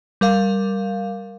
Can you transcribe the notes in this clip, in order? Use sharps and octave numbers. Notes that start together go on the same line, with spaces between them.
G3 A#4 F5